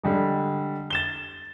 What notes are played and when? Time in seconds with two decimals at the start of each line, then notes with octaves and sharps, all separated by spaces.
0.04 D3 G3 G#3
0.90 A6 E7 G7